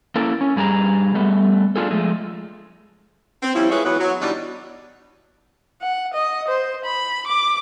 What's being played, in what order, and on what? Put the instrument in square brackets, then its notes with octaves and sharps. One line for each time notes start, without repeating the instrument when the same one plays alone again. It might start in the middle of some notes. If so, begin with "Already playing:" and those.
[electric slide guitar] A#3 C#4 E4 A4 A#4
C#4
G2 G3 G#4 A5 A#5
G3 A3 B3
D4 F4 G#4 A4
F3 G#3 A3
[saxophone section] C4
F3 G3 C4 C#4 E4
G#3 F4 G#4 B4 C#5 E5
E3 F#3 B3
F#3
B2 E3 G3 D4 D#4
[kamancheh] F#5
D#5
C5
B5
D6